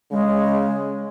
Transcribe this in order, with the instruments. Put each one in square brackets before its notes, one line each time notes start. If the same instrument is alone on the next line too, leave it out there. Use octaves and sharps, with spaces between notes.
[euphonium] C#3 [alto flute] G#3